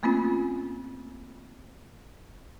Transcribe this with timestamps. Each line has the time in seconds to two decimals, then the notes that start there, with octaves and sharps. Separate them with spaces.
0.03 A3 A#3 C4 C#4 F4